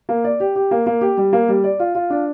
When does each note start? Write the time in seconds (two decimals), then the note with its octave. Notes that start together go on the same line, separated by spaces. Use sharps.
0.09 A#3
0.24 D5
0.40 G4
0.56 G4
0.71 A#3
0.86 A#3
1.01 G4
1.17 G3
1.33 A#3
1.48 G3
1.64 D5
1.80 F4
1.95 F4
2.10 D4